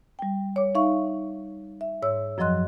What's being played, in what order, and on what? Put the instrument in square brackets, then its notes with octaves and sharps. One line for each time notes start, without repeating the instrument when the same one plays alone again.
[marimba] G3 G5
C#5 D6
D#4 E5 F5 C#6
E5
G#2 C#5 E6
F#2 F3 F#3 D#5 C6 F#6